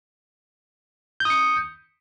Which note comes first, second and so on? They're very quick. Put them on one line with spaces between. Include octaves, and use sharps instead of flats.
G6 D#6 C#7